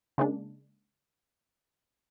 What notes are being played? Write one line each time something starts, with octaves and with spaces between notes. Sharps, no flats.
C#3 G#3 A#3 D4